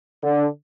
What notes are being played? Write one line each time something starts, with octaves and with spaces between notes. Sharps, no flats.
D3